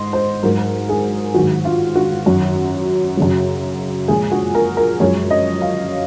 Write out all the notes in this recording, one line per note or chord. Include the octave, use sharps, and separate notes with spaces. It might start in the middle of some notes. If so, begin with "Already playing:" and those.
Already playing: G#2 D#5 C6
C5
G#2 F#3 A#4
G#4
G#2 D#3 F#3 F#4
F4
F#4
F#2 D#3 F#3
F#2 C#3 F#3
A#2 F3 G#3 G#4
F#4
A#4
A#4
F#2 F3 G#3 C#5
D#5
F5